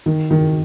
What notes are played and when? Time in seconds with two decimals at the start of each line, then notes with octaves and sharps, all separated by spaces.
0.06 D#3
0.31 D#3